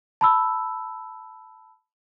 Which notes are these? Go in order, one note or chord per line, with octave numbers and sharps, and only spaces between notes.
A5 B5 E6